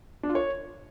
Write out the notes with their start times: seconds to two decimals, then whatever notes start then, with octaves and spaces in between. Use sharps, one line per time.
0.23 D4
0.29 F4
0.35 C#5